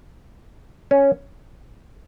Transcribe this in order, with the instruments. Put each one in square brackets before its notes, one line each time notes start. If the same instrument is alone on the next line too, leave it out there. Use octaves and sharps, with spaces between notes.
[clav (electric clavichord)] C#4